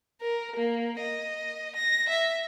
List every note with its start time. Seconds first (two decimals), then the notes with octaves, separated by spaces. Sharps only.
0.21 A#4
0.56 A#3
1.00 D#5
1.76 A#6
2.09 E5